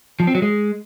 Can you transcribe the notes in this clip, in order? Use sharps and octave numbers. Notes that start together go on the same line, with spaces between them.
F3
C4
F#3
G#3